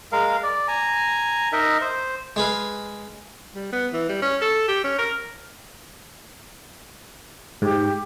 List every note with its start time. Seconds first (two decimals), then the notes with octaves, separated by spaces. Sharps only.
0.12 G#3 A#4 F5
0.43 D5
0.68 G#5 A#5
1.52 D#4 A#4 D#5 E5
1.81 C5
2.36 G#3 G#4 B4 F5
3.55 G3
3.72 B3
3.93 E3
4.09 G3
4.22 C#4
4.42 A4
4.68 G4
4.84 C#4
4.98 A#4
7.62 G#2 G4